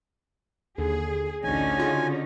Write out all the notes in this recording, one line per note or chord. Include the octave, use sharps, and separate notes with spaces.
D#2 D3 G#4
A1 D2 D3 C#4 D#4 G#5
C#3 F4 F#4